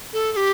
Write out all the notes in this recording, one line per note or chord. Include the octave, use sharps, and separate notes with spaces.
A4
A4
G4